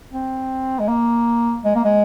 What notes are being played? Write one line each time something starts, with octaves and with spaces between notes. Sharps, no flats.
C4
G#3
A#3
G#3
A#3
G#3